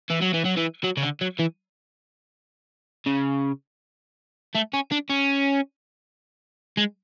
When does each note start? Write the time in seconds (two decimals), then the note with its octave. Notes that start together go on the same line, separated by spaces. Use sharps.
0.10 E3
0.21 F#3
0.34 E3
0.45 F#3
0.57 E3
0.84 F#3
0.97 C#3
1.03 D3
1.21 F#3
1.40 E3
3.06 C#3
4.55 A3
4.73 C#4
4.92 D4
5.10 C#4
6.77 G#3